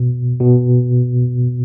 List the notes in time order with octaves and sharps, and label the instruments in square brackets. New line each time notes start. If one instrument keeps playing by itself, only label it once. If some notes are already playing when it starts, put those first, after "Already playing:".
Already playing: [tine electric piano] B2
B2